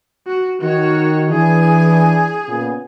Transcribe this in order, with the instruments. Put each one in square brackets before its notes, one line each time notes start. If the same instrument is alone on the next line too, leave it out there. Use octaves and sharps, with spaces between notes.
[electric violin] F#4
[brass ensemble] D#3 [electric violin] F#4 C#5
[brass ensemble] E3 D4 E4 [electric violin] G#4 G#5
[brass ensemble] A#2 C#3 B3